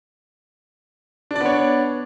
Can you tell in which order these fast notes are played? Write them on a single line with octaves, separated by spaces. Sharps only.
D4 D5 B3 C#5